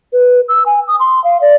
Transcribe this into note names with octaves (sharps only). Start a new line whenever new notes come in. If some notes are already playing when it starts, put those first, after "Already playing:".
B4
E6
G#5
D#6
C6
F5
D5